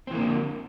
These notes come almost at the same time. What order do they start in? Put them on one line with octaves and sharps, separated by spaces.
C4 E3 A#3 D3 F3